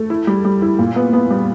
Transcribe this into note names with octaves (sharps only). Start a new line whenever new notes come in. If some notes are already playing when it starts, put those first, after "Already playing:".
Already playing: A3
E4
G3
G3
E4
A#2
B3
B3
G3